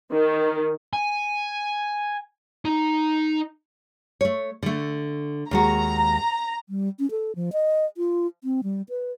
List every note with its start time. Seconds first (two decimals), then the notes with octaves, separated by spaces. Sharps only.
0.13 D#3
0.93 G#5
2.65 D#4
4.21 A3 C#5
4.63 D3 A3
5.51 D#2 G#3 F#4 A#5
6.69 G3
6.99 C#4
7.11 A4
7.36 F3
7.53 D#5
7.97 F4
8.44 C4
8.63 G3
8.89 B4